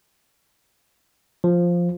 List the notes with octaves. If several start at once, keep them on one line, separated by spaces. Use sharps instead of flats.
F3